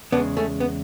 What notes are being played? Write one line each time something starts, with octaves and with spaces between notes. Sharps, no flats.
E2 C#3 G#3 B3 D4
A3 C#4
B3